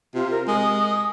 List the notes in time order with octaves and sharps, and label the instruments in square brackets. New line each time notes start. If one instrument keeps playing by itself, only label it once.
[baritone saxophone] C3 [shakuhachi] F4
[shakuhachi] A#4
[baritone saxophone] G#3 [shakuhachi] D#6